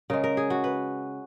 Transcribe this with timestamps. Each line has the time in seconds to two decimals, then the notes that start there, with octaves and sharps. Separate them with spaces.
0.10 C#3 G#3 A#4
0.24 A#4
0.37 G#4
0.50 F#4
0.64 B4